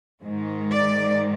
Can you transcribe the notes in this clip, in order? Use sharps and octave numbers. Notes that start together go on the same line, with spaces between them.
G#2 D#3 G#3
D5